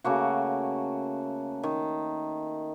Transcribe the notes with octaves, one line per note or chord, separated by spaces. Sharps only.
C#3 A3 A#3 F#4
D#3